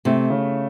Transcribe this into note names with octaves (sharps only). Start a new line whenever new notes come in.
C3 A3
C#3